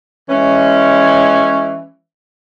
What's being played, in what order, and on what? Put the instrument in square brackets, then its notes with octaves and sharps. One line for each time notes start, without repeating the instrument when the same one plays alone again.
[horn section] E3 G#3 C#4